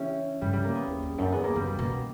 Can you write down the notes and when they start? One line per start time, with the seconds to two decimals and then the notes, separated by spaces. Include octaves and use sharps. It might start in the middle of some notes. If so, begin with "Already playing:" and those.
Already playing: E3 C#4 E4 G4
0.41 G2 G3
0.53 G3
0.64 A#3
0.75 B3
0.88 E2
1.03 E2
1.18 F#2
1.32 E2 B3
1.44 A#3
1.56 F#2 G3
1.67 G3
1.79 B2 A#3